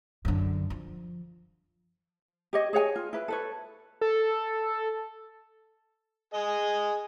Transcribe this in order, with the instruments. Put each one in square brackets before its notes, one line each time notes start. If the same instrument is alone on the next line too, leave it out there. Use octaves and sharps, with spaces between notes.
[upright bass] F#2 D3
F3
[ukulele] G4 C#5 D#5
G#4 C#5 F#5 G#5
F4
E4 B4
A4 B4 C#5
[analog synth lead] A4
[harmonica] G#4 D#5